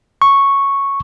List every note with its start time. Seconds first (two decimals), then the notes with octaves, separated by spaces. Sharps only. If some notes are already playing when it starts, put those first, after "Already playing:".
0.22 C#6